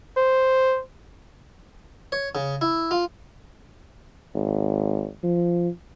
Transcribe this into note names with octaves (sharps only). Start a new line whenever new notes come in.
C5
C#5
C#3
E4
F4
G#1
F3